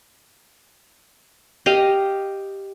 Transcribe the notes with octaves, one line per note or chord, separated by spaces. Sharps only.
G4 D#5 F5